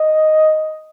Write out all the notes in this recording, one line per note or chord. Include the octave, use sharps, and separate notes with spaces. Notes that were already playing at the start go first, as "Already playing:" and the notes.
Already playing: D#5